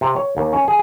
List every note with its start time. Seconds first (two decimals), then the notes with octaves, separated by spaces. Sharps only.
0.01 C3
0.16 C#5
0.37 D#2
0.53 C#4
0.68 G#4